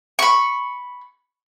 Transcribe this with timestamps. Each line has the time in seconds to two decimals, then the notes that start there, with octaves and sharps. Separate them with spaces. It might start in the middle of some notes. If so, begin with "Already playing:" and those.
0.19 B5 C#6